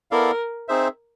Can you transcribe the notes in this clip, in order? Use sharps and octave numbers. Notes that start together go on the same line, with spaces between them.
B3 E4 A4 A#4 D5 F5
C4 D#4 G#4 C5 E5